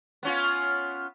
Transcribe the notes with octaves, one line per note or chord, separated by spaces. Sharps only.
B3 C#4 F4